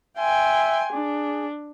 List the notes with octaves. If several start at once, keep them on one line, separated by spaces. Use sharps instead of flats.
E5 G5 G#5 C6
D4 G#4